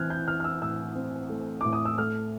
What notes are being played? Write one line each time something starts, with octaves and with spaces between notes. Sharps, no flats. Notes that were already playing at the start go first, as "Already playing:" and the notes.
Already playing: E3 A3 C4 F6 F#6 G#6
G6
E3 F6
F6
E6
A2 E6
C4
A3
A2 D6
D#6
E6
A3 F6